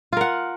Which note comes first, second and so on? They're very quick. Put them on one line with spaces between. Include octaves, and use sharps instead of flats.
F4 A#4 F#5